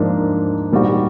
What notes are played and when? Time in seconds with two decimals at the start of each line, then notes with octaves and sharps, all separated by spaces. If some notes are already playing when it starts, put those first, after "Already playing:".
Already playing: G#2 F3 A#3 D4
0.72 A#2 G3 C4 D#4 F#4